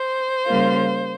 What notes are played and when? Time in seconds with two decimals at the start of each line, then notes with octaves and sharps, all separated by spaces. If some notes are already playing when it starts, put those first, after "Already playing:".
Already playing: C5
0.47 C#3 G3 A#3 F4